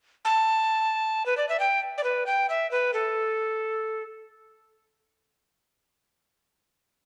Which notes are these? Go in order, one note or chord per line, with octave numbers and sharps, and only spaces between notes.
A5
B4
D5
E5
G5
D5
B4
G5
E5
B4
A4